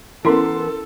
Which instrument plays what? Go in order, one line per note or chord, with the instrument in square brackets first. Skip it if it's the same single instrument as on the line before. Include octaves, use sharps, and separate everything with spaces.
[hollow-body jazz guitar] E3 B3 [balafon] C#4 E4 [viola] A4 [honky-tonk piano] A#4 C6